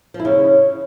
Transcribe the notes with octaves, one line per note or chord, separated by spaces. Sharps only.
F3
E4
C#3